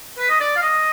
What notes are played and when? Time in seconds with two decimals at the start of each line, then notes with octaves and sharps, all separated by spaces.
0.19 B4
0.29 D#5
0.41 D5
0.57 F5
0.63 D#5